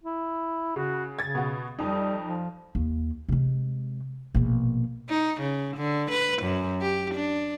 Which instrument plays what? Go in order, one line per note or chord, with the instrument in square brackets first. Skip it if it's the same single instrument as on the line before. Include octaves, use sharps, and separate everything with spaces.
[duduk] E4
[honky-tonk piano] C#3 [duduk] F#4
[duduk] C#3 [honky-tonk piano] G#6 A6
[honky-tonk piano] B2 F#4
[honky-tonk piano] F2 D#4 [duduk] G3
[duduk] F3
[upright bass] D#2
C3 G#3
A#1 B2
[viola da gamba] D#4
C#3
D3
B4
F#2
G4
D4